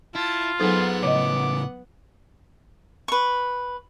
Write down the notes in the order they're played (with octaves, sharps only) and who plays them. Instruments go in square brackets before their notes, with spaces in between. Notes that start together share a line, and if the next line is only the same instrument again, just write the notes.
[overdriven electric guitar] E4 [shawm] F4 [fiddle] A5
[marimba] F#3 D#4 A4 [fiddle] B3 F#5 [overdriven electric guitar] G#4 C5
[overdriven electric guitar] A2 C#3 [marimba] C#5 D#5 [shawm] D6
[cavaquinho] B4 C#6